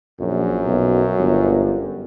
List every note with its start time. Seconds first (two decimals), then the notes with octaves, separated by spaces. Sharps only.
0.20 A#1 F#2
0.67 B1
1.19 G1